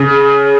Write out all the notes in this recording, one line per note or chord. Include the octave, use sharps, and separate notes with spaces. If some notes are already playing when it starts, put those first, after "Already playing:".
Already playing: C#3